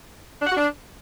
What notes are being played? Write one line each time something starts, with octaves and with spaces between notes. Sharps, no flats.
D4
F#5
F#4
D4